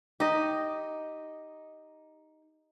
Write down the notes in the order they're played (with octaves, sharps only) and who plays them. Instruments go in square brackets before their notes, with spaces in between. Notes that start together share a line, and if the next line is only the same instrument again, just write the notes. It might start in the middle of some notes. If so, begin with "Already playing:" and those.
[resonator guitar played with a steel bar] D#4 [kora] G4 D#5